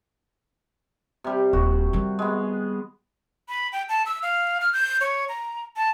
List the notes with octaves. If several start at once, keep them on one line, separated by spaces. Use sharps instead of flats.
C3 G3
D#1 F#4
D#3 G3
G#3 B3
B5
G5
A5
E6
F5
F6
G6
C#5
A#5
A5